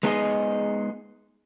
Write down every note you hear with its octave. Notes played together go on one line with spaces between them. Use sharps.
G#3 B3 D4 D#4 G#4 D#5